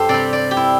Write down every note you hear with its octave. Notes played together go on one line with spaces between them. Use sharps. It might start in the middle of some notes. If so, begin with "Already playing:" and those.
Already playing: G2 G4 A4 C5
C3 G3 D5
D5
G4
E4